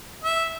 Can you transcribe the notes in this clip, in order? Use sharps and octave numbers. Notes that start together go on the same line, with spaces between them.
E5